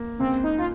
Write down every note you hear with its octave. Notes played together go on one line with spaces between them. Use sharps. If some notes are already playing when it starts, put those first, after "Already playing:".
Already playing: A#3
C#2 C4
D#4
F4